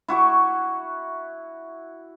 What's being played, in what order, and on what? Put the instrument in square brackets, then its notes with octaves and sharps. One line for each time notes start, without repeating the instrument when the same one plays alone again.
[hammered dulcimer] E4 F#4 C#6 D6